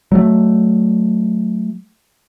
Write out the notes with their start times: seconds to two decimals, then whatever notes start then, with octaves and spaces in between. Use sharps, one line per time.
0.12 F#3 A3